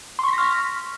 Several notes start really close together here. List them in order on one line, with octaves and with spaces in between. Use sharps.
C6 C#6 B6 A#6 F6